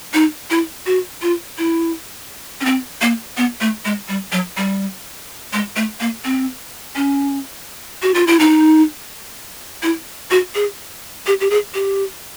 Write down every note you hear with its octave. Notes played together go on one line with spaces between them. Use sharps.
D#4
E4
F#4
F4
E4
C#4
C4
A#3
B3
A3
G#3
G3
F#3
G3
G#3
A3
A#3
C4
C#4
F#4
F4
E4
D#4
E4
F#4
G#4
G4
G4
G#4
G4